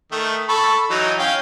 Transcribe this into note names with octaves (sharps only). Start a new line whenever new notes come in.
D#3 A3
A4 B5 C#6
E3 F#3 D#4
C#4 F5 G5